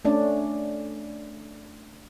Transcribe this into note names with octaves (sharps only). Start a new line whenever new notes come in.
A3 C#4 D4 D5